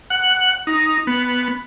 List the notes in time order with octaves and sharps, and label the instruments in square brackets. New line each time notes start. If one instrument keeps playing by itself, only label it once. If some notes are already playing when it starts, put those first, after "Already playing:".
[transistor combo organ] F#5
D#4
B3